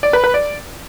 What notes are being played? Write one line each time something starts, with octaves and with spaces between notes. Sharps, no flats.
D5
B4
B4
D5